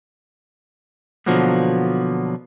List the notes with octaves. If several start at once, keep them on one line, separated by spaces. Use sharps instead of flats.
B2 D3 F3 F#3 A#3 B3